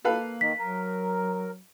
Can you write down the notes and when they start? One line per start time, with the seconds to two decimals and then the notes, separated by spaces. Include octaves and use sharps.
0.05 A#3 A4 B4 F5
0.41 D#3 B6
0.59 F#3 A#4